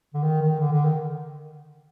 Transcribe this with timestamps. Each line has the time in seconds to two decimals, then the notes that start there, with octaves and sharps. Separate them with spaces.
0.14 D3
0.23 D#3
0.42 D#3
0.60 D3
0.72 D3
0.85 D#3